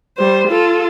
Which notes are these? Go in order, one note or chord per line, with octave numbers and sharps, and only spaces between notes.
G3 C5
F4 A4